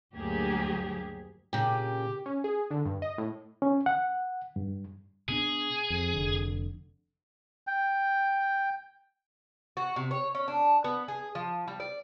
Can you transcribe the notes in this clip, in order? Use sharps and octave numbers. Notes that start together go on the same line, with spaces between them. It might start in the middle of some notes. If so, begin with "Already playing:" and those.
D2 G2 F#3 A#3 G4 G#4
A#2 C#3 G4
C#4
G#4
D3
G2
D#5
A2
C#4
F#5
G2
B2 B3 D4 G#4
F2
F1 D3
G5
F#4
C3
C#5
C#4
D4
B3
G#4
F3
G3
D5